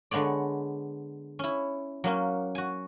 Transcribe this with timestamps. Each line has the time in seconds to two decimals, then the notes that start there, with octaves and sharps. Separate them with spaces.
0.11 D3 G#3 B3 C#5 D5
1.39 C#4 E4
2.04 F#3 A#3 C#4
2.55 F#4 G#5